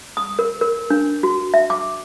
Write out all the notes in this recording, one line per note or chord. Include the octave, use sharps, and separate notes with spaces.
D#6
A#4
A#4
D4
F#4
E5
D6